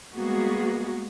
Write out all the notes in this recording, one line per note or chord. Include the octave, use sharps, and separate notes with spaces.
G3 G#3 A#3 B3 F#4 G#4